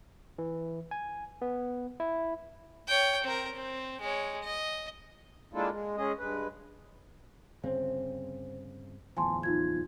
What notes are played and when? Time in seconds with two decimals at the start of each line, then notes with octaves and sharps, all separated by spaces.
0.38 E3
0.91 G#5
1.42 B3
2.00 E4
2.87 C#5 G5
3.24 C4 A#4
3.54 C4
4.01 G#3 C#5
4.43 D#5
5.54 G#3 A#3 D4 E4 F4 A4
5.71 G#3
5.97 G#3 C#4 G#4 D#5
6.18 G2 G#3 B4
7.64 G1 C#3 C4 C5
9.17 D1 E2 F3 G#5 A5 C6
9.43 D#4 F4 G#6